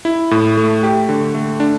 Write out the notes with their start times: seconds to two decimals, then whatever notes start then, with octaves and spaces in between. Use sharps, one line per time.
0.05 E4
0.31 A2
0.57 A3
0.83 G4
1.09 D3
1.34 A3
1.60 D4